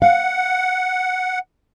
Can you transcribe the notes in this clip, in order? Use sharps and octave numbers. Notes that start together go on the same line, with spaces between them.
F5 F#5